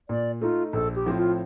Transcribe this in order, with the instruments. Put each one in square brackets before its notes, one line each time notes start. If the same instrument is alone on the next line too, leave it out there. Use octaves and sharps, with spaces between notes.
[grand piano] A#2 [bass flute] D5
[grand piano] A3 D#4 [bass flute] F4
[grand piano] A#1 [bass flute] A4
[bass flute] G4
[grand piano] A2 F3 C4
[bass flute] F4